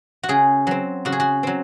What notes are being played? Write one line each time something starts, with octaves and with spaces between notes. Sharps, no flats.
F#4
C#3 G#4
F#3 C4
C#3 F#4
G#4
F#4
F#3 C4